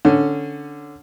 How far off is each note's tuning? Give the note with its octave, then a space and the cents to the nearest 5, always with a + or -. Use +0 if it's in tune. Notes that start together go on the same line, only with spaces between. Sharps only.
D3 +0 C#4 +0